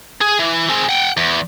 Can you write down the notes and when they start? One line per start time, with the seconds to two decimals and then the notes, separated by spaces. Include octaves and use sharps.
0.21 G#4
0.39 E3
0.68 G#3 C4
0.89 F#5 G5
1.17 E2